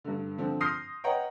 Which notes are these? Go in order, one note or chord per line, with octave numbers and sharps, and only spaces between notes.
G2 D3
D3 F3 C4
C6 D#6 F6 G6 A#6 C7
B4 C#5 D#5 F#5 G5 A#5